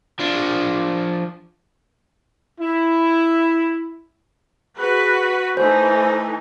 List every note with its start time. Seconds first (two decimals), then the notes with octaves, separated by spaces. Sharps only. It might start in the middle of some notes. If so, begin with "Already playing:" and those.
0.20 F3 D4
2.60 E4
4.77 F#4 G#4 B4
5.57 E3 A3 D#4 C5 G#5